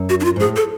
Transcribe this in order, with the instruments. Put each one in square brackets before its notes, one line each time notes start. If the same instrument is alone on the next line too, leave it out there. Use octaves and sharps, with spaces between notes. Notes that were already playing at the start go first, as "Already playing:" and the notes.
Already playing: [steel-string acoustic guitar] F#2
[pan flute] F#4
D4
F4
[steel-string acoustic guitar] G#2
[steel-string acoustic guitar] A2 [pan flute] G#4
[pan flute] A4